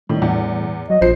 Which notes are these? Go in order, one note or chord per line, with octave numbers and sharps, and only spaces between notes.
A2 D#3 G3
E2 A2
F#3 D#5
A#1 F3 C5 C7